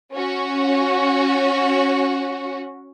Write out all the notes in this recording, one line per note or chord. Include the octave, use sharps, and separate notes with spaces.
C#4 F#4